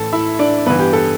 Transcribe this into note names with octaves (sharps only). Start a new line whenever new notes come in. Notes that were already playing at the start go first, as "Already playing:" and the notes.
Already playing: A2 E3 A4 A5
E4 E5
D4 D5
G2 E3 B3 B4
G4
A4